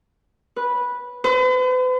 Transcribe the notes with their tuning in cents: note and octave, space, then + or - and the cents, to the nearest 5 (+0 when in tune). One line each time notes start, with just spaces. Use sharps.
B4 -10
B4 +45